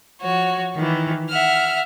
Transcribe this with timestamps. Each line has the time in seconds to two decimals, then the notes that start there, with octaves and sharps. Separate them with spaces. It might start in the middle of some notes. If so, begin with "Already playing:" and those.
0.21 F3 F#4 C#5
0.76 D#3 E3
1.29 E5 F#5 F6